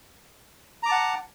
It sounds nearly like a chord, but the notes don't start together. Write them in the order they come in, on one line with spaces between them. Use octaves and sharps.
A#5 D6 A5 F#5